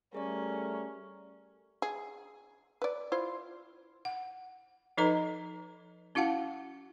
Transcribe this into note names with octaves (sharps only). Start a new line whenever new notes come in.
G3 A3 C#4 G#4 A#4 D5
G#4
B4 D5
E4 F4 C5
F#5
F3 D#4 A4 B4 D#5 A#5
C#4 E4 F#4 F5 F#5 A5